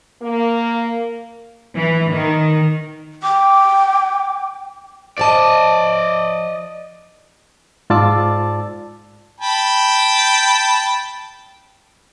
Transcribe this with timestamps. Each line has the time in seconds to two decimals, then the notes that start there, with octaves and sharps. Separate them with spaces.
0.22 A#3
1.76 E3
2.11 D#3
3.23 G5 D6
5.18 F3 D5 D#5 G5 A5
7.90 G#2 F4 D5 A5 D6 E6
9.41 G5 A5 B5